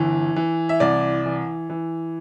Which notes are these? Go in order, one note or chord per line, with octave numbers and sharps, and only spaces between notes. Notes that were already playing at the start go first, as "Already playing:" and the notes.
Already playing: G1 E3
E3
E5
C2 D5
E3
E3